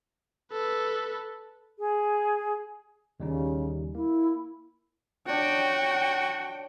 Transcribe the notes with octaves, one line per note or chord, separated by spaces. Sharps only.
A4 B4
G#4
D#2 C#3 G3 D#4
A#3 E4
D4 F#4 C#5 G5